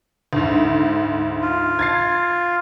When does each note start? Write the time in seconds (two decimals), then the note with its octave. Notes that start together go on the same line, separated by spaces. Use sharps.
0.33 D2 G#2
1.42 F4
1.79 G#6 A6 C7